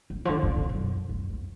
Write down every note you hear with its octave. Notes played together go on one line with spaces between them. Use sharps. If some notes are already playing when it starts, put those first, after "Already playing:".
D3
F3
D3
C#3
B2
F#2
F2
F2